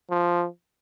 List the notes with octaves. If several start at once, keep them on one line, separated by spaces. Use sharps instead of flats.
F3